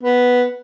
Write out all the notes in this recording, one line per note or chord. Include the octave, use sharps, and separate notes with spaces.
B3